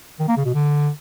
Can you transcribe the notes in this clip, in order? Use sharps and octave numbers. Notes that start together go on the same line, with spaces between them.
D#3
A#3
C#3
B2
D3